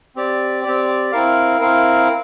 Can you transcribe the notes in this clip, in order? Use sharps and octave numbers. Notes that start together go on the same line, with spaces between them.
C4 G4 D5
C4 G4 D5
C4 E4 A#4 F5
C4 E4 A#4 F5